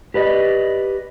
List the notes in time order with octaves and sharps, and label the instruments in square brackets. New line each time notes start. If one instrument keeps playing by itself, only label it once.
[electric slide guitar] G4 B4 D5 D#5